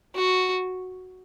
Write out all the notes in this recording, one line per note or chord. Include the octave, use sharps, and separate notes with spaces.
F#4